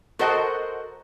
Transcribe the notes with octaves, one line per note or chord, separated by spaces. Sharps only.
F#4 A4 A#4 C5 D#5 F#5